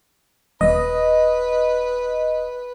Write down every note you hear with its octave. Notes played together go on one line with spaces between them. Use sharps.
D#1 B4 D#5